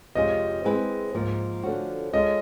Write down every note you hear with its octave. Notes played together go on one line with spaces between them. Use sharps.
F2 C3 F3 G#3 C#4 D#5
G#3 C4 E4 G#4 B4
G#2 F3 A#3
D3 F3 A3 C#4 F#4
G#3 C#4 F4 A4 C5 D#5